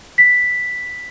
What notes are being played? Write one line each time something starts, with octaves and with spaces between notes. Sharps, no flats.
B6